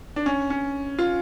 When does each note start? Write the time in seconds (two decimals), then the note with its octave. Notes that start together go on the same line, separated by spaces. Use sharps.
0.16 D4
0.26 C#4
0.50 C#4
0.99 F4